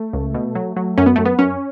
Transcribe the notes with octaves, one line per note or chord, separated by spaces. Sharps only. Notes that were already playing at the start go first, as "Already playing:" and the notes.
Already playing: A3
C#2
B2
F#3
F#3
F#2 C#4
B3
F#2 A3
B3
F#2 C#4